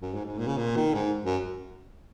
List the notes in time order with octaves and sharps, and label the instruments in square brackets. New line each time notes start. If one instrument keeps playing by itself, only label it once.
[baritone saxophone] F#2
G#2
G#2
A#2
C#3
A#2
D#3
G#2
F#2